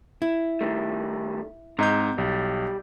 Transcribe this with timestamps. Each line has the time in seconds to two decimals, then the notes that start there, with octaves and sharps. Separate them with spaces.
0.22 E4
0.61 D#3 G3 A3
1.79 G#2 C4 D#5 A#5 G6
2.18 B1 G3